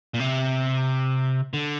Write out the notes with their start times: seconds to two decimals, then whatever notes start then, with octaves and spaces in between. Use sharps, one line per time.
0.14 A#2
0.20 C3
1.54 D3